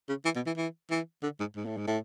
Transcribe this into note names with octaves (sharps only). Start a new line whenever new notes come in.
C#3
E3
B2
E3
E3
E3
D3
G#2
G#2
A2
G#2
A2